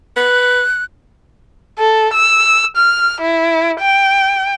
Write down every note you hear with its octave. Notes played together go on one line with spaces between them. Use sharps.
B4 F#6
A4
E6
F6
E4
G5